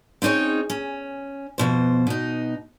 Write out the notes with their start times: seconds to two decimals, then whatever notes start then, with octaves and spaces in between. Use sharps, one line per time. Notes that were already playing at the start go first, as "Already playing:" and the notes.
0.22 C4 C#4 D#4 G#4 C#5
0.70 C#4
1.58 F2 B2 C5
2.07 B2 D#4